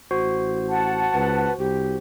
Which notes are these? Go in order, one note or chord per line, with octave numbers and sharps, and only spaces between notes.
A1 F#4 C5
F#5 A5
C#2 B4
C2 G4